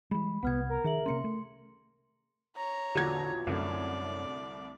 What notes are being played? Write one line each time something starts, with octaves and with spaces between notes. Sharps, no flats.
E3 G3 G#3 B5
C2 C3 B3 F#5 F6 G#6
A#4
D#3 G#4 E5 F#7
C3 A#3 C#4 C6 C#7
A3
C#5 A#5
A#1 E2 A#2 D3 F#4 G#6
C2 F#2 D3 A3 D5